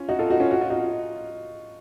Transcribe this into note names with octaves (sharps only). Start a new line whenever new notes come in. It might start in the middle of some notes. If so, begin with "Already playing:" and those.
Already playing: C#4 F4
D#4 F#4
F4 A4
D#4 F#4
C#4 F4
F#4
F4
D#4 F#4